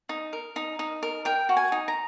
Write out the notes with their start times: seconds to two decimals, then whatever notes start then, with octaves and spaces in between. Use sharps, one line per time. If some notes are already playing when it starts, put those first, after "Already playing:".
0.09 D#4
0.33 A#4
0.56 D#4
0.79 D#4
1.03 A#4
1.25 A#4 G5
1.49 F#4
1.57 G#5
1.72 D#4
1.88 A#5